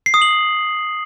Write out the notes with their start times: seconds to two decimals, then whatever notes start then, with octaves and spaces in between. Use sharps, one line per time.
0.06 C7
0.14 D#6
0.22 F#7